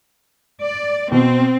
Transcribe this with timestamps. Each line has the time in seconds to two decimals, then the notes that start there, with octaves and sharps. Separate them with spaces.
0.61 D5
1.12 B2 C4